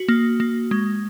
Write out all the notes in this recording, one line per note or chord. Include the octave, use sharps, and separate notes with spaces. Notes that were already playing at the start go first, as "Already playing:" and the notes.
Already playing: F#4
A#3
A#3
G#3